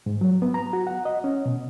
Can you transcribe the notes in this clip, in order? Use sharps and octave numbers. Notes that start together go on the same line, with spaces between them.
G#2
F#3
B3
A#5
F#4
F#5
D#5
C#4
B2